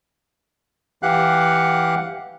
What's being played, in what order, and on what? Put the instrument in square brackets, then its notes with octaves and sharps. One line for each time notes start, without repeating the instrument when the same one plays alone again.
[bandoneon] E3 G4 F5 F#5 F#6